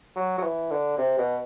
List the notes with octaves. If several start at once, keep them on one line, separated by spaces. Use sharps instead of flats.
F#3
F#3
E3
D3
C3
B2